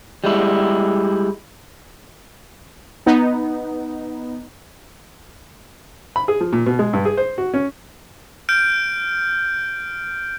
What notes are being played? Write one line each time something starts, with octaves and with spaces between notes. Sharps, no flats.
G3 G#3 E4
B3 D#4
B5
G#4
F3
A#2
B2
G#3
G2
G#4
C5
F#4
C#4
F6 G6 D7